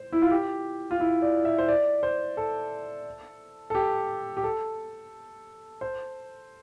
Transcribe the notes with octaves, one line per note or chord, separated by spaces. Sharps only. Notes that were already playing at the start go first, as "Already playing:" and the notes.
Already playing: C5
E4
F4
G4
F4
E4
D5
E5
C5
D5
C5
A4
A4
G4
G4
A4
C5